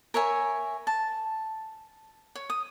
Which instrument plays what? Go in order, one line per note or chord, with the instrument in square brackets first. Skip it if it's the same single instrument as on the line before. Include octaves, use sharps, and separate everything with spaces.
[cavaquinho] A#4 C#5 E5 G#5
A5
C#5
D#6